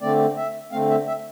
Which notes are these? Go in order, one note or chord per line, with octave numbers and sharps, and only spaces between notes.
D3 A3 C4 D5
E5
D3 A3 C4 F5
E5
E5